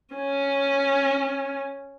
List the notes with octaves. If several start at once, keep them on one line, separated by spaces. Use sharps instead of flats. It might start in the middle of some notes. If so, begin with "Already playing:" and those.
C#4